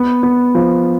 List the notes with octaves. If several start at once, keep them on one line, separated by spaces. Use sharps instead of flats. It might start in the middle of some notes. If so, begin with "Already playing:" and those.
Already playing: B3
B3
F3